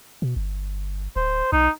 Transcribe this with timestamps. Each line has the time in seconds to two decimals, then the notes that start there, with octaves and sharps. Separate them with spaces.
0.22 B2
0.36 G1
1.16 D1 C5
1.52 B1 D#4